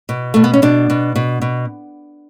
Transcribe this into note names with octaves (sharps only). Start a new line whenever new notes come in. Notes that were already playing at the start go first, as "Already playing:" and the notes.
B2
B2 A3
B3
C#4
B2 D4
B2
B2
B2